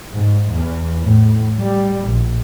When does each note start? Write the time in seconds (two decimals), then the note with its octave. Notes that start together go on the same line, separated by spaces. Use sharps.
0.13 G#2
0.51 E2
1.02 A2
1.60 G3
2.08 A#1